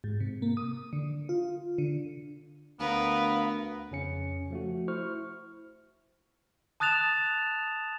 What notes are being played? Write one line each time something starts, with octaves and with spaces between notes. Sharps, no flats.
G#2
C3
A#3
D#6
D3
F4
D3
D2 B3 A#4 B4 F5
F2 C#3 C#4 C#7
F3 A3 F#4
E4 C5 C#6 F6
A5 D#6 F#6 A6 E7 F7